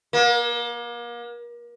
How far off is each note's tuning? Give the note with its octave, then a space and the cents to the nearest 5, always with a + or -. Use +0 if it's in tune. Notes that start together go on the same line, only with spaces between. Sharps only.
A#3 +35